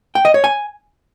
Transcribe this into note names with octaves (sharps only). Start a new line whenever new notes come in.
G5
D#5
C#5
G#5